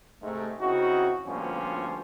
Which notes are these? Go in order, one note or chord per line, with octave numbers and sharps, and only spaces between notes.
G#2 C3 G#3 A3
C#3 C4 D#4 E4 F#4
D2 G2 A#2 F3 B3 C#4